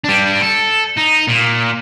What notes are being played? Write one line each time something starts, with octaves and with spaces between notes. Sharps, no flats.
G3 D4
A4
D#4
A#2